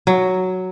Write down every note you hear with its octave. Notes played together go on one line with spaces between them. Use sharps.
F#3